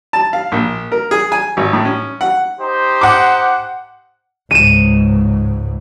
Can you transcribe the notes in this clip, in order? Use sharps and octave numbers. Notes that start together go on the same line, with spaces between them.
A5
F5
A#1
A#4
G#4
G#5
G#1
A2
C#4
F#5
D#4 G4 C5
F#5 D6
C#2 G#2 D#7 E7